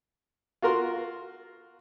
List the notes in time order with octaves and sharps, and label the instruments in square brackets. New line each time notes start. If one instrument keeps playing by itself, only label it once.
[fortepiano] F4 F#4 A#4 C6